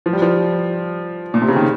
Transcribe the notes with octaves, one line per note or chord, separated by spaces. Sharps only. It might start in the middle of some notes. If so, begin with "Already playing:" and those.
F3
G3
F3
A#2
C3
C#3
D#3